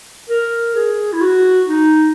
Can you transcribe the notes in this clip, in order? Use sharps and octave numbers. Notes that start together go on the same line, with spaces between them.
A#4
G#4
E4
F#4
D#4